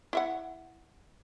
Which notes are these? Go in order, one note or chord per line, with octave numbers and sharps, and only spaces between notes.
E4 E5 F#5